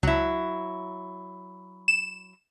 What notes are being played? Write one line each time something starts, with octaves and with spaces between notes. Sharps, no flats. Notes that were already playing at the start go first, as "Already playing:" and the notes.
C#2 F#3 E4
E7